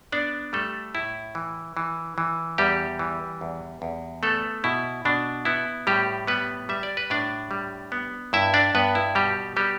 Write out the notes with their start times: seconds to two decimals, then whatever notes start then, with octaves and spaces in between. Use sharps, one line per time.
0.12 B3 D4 D5
0.53 G3 A3 A4
0.95 A2 E4
1.35 E3
1.77 E3
2.18 E3
2.58 E2 G3 G4
2.99 E3
3.41 E2
3.82 E2
4.23 A3 B3 A4
4.64 B2 E4
5.05 B2 D4
5.45 B3 E4
5.87 A2 G3 G4
6.27 G3 B3 B4
6.69 G3 E5
6.83 D5
6.97 B4
7.10 A2 D4 D5
7.51 G3
7.92 B3
8.33 G2 E4 E5
8.54 D4 D5
8.75 G2 B3 B4
8.95 E4
9.15 B2 G3 G4
9.56 G3 B3 G4